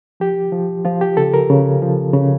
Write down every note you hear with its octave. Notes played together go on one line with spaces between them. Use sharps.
F3 G4
F3
F3 F4
G4
C#3 A4
A#4
C#3
F3
C#3